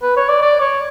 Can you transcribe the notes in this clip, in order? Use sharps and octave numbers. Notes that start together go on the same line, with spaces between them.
B4
C#5
D5
D5
C#5